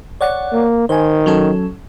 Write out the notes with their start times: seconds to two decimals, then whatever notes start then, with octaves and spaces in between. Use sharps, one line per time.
0.21 C#5 D5 F#5
0.53 A#3
0.89 D#3 C5 G#5
1.26 F#3 C#4 A4